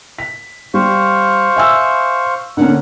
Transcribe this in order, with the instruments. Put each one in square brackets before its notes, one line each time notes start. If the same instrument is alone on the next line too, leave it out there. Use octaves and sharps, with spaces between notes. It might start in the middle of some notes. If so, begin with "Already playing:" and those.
[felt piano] B6
[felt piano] G3 [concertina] C5 F5 C#6
[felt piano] E5 G#5 E6
[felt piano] D3 A#3 C#4 [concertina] F#5